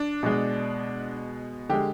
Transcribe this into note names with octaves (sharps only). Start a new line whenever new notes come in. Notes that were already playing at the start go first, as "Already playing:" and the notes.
Already playing: D4
B2 G#3
D3 G#3 G4